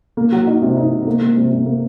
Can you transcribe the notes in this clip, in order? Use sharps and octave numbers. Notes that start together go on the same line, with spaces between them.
A#3
F#3
D#4
C3
D#4
C3
A#3
A#3
C3
C3
A#3